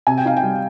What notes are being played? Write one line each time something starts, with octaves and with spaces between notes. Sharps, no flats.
C3 G#5
G5
D#4 F5
G5
G3